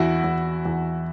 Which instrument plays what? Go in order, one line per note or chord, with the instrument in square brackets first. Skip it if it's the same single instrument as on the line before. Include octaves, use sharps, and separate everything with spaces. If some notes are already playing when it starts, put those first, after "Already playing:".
Already playing: [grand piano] E2 E4 F#4
E2
E2